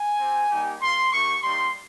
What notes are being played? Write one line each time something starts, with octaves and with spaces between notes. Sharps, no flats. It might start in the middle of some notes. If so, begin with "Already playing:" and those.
Already playing: G#5
C4 G4
G3 A#3 D#4 G4
A#3 F4 C6
A#3 D#4 G4 C#6
G3 A#3 D#4 C6